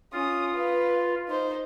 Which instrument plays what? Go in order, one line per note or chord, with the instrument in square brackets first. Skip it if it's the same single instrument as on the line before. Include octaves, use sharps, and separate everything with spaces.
[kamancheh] C#4 D#6 [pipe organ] F4
[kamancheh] B4 F5
D#4 C5